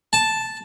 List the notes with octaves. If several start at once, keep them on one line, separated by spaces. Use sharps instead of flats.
A5